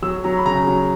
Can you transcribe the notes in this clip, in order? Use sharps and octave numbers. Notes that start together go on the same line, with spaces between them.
F#3 E6
F#3 A#5
B5
C#3 A#5
F#3